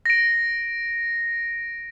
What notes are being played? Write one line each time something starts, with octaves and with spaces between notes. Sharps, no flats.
A#6 D7